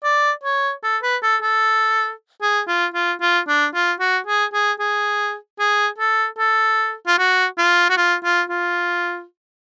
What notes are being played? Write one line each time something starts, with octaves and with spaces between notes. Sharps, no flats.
D5
C#5
A4
B4
A4
A4
G#4
F4
F4
F4
D4
F4
F#4
G#4
G#4
G#4
G#4
A4
A4
F4
F#4
F4
F#4
F4
F4
F4